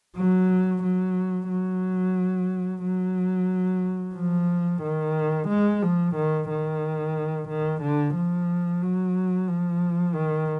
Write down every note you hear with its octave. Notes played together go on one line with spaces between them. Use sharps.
F#3
F#3
F#3
F#3
F3
D#3
G#3
F3
D#3
D#3
D#3
D3
F3
F#3
F3
D#3